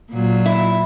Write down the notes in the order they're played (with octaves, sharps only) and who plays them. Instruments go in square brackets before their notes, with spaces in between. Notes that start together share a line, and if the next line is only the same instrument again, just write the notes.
[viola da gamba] A#2 F#3 F4
[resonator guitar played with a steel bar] E4